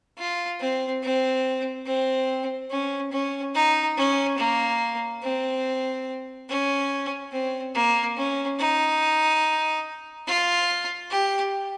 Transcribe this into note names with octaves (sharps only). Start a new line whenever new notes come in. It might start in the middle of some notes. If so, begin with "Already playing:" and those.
F4
C4
C4
C4
C#4
C#4
D#4
C#4
A#3
C4
C#4
C4
A#3
C#4
D#4
F4
G4